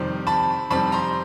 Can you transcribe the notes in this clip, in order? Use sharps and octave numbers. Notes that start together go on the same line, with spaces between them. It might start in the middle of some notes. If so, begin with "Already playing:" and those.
Already playing: F2 C3 D#3 G3 C4
A5 B5
F2 C3 D#3 G3 C4 A5 B5
A#5 C6